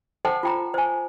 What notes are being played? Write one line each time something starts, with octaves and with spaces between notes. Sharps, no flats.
A4 C5 F#5 G5 A5
F4 G5 A#5
C5 G#5